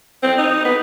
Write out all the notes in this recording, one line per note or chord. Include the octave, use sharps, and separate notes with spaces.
C4
D#4
B3